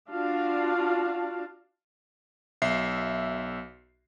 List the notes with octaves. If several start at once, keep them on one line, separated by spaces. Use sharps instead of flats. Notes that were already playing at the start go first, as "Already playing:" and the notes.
D4 F4 F#4 F5 A5
B1 E5 C7